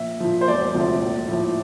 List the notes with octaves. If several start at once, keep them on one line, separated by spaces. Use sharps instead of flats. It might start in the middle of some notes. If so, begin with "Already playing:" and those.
Already playing: A#1 E5
A#2 F3
C5
E1 D5
D2 C3 F3
A#1
A2 F3